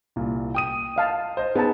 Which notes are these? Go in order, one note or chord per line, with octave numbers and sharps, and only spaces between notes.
C2 A#2
G5 D#6 D#7
D#5 F5 A5
C5 D#5
B3 D#4 G#4 A5